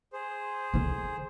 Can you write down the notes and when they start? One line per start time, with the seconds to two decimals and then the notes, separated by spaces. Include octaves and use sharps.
0.13 G#4 C5
0.74 D3 D#3